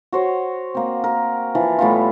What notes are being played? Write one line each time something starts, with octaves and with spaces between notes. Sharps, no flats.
F#4 C5 C#5
A#3 C4
A#4
E3 F3
A2 G3 B3 F4